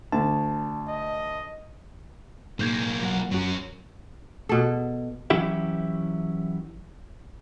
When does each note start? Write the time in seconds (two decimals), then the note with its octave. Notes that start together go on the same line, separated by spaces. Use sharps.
0.12 D2 A5
0.89 D#5
2.59 B1 G#2 A#3 G6 G#6
3.03 F#3 F#5
3.32 F#2 F#3 C#4 F#4
4.49 B2 A4
5.30 E3 F#3 C#4 E4 G4 E5